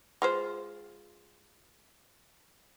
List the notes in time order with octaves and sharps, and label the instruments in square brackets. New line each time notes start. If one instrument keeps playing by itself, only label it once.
[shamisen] G#3 F4 C5